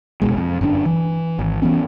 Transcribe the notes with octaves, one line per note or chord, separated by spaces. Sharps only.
F1 D#2 B2 G#3
F2
G1 F#2 A2 D4
E3
G#1
E3 F3 B3 C#4